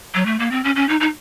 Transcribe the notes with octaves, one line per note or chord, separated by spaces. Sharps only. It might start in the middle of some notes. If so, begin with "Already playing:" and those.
F#3
A3
A#3
C4
C#4
C#4
D#4
D#4